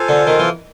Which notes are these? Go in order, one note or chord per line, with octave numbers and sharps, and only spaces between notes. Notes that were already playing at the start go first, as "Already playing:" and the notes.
Already playing: F4 A4 C5 F5 G#5
D3
D#3
E3